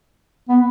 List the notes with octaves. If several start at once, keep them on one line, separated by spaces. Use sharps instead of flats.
B3